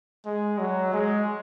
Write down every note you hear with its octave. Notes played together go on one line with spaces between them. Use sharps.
G#3
F#3
G#3